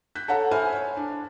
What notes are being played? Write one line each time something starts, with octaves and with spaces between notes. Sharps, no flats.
F#6 G6 B6
A4 C#5 F#5 A#5
C5 E5 G#5 B5 F6
C#5
D4